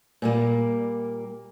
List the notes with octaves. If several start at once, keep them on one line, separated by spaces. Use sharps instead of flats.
A#2 G3 A#3